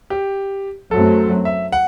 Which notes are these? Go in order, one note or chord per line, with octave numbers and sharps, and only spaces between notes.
G4
F#2 F#3 A3 C4 A4
E5
F#5